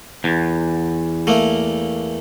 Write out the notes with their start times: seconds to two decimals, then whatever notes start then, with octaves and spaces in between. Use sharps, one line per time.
0.24 E2
1.27 A3 A#3